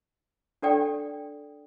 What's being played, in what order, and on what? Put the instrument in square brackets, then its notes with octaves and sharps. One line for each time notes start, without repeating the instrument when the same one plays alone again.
[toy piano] D4 A4 D5 G5